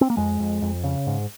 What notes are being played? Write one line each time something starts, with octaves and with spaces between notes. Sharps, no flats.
C4
A#3
F2 G#3
F2
F2
C#3
G#2